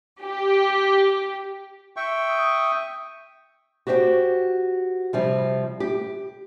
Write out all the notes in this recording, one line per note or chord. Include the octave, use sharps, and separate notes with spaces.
G4
E5 G5 C#6
D#6
F#4 G4 C5 E5 G5
C3 F3 G3
G4